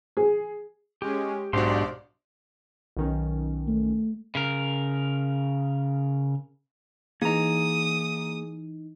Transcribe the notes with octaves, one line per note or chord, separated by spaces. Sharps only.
G#4
G#3 C#4 G4
B1 G#2 D4 F#4 G4 C5 D5 C6
B1 D#3 C#4
A3
C#3 A#4
E3 A#3 D#4 G#4 A#5 D#6